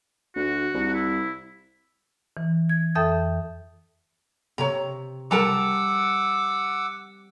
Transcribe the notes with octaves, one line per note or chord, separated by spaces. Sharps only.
D2 F#4
C2
E4
E3
G#6
F2 A4 E5 G5 D#6 G6
C3 C#5 A#5
G3 A#4 F#5 A5 A#5 D6 E6 C#7